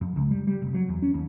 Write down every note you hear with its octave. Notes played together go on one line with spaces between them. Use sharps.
F2
C#2
G3
G3
F1
F#3
E2
C#4
D#2